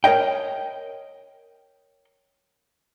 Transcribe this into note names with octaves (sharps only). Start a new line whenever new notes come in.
A#4 C#5 D#5 G5